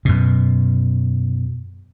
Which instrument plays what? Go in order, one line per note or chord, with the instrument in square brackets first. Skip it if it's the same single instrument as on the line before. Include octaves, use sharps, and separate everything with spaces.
[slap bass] F#2 B2